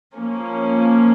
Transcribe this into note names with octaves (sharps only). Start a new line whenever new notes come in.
F3 A#3 C#4